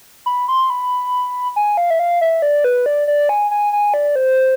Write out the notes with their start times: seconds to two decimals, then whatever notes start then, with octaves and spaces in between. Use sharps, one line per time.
0.26 B5
0.48 C6
0.70 B5
1.56 G#5
1.77 F5
1.90 E5
1.99 F5
2.21 E5
2.42 D5
2.64 B4
2.86 D5
3.08 D5
3.29 G#5
3.51 G#5
3.73 G#5
3.94 D5
4.16 C5